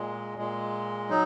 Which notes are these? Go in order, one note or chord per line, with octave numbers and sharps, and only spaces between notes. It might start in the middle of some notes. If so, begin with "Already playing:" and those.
Already playing: A#2 G#3
A#2 G#3
F#3 D#4